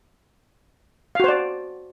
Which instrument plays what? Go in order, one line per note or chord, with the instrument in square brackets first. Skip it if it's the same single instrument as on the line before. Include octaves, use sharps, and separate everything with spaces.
[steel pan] F5
F#4
C5
D5